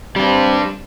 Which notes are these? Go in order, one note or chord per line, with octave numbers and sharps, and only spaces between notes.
G3 C4 D4